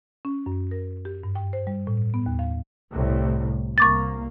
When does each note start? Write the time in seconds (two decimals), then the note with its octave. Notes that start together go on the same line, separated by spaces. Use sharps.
0.25 C#4
0.46 F#2
0.71 A#4
1.05 G4
1.23 G2
1.35 G5
1.53 C5
1.67 G3
1.87 A2
2.14 B3
2.26 D#2
2.39 F5
2.91 C2 A2
3.78 C2 A#3 C#6 D6 A6